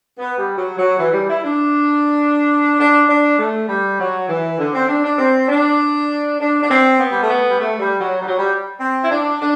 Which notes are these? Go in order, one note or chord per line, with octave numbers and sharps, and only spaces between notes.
B3
G3
F#3
F#3
E3
G3
E4
D4
D4
D4
A3
G3
F#3
E3
D3
C4
D4
D4
C4
D4
D4
D4
C4
B3
G3
A3
B3
G3
A3
G3
F#3
G3
F#3
G3
C4
E4
D4
D4